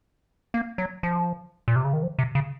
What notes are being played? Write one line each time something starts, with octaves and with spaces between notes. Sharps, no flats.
A#3
F#3
F3
A#2
C3
C#3
D#3
F3
C3
C#3